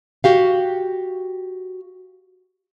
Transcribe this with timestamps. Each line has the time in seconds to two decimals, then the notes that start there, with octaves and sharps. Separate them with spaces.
0.24 F#4 G4 F5